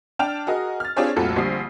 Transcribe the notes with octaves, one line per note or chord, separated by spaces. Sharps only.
D4 G5 A5 F6 F7
F#4 G#4 A#4 D#5
F6 A6
C4 D4 F4 G4 G#4 C#5
F1 C2 A#2 F#4 A4 F6
A#1 D3 G3 D#6 C7